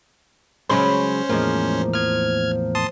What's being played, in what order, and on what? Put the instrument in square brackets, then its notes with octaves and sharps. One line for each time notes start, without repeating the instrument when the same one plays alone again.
[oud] C#3 F#3 G#3 [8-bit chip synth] C#4 C5 [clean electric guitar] B5
[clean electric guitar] E2 A2 A#3 [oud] F3 G#3
[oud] F3 [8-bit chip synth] F6 G#6
[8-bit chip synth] A5 C6 D#6